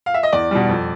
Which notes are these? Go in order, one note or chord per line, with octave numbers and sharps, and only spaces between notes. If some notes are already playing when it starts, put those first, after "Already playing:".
F5
E5
D#5
E2 D5
B2 G3
F2